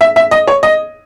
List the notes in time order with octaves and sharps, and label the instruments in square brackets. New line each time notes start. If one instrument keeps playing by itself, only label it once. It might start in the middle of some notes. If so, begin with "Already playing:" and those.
[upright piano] E5
E5
D#5
C#5
D#5